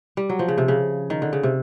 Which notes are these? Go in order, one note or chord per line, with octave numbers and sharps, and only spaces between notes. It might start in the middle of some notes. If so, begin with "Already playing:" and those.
G3
F#3
F3
C#3
C3
C#3
D#3
D3
C#3
C3